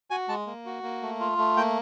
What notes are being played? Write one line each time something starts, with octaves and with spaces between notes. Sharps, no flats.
F#4 G#5
G#3 A5
A#3
F#4
A#3
A3
F4
A3
A#3 G5